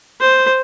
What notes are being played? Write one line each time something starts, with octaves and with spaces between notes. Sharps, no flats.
C5